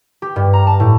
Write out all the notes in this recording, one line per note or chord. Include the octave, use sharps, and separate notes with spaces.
G4
G2
A#5
A5
A2